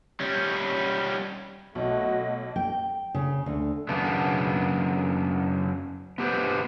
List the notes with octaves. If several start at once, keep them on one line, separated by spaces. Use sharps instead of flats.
G3 C#4
B1 A3 F#4 D#5
G5
C#3
D2
F#2 C#3 A#3 B3 D4
B3 G4 B4 C5